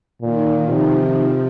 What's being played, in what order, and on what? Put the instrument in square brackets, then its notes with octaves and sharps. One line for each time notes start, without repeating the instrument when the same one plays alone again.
[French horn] A#2 [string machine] D#3
[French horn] C3 [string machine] F3
[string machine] F3